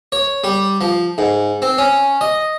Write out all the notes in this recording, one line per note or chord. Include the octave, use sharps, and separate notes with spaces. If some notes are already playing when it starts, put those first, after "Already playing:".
C#5
G3
F3
G#2
C4
C#4
D#5